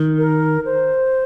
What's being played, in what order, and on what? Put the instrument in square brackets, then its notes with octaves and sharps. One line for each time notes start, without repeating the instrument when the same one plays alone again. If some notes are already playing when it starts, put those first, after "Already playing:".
Already playing: [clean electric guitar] D#3
[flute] A#4
C5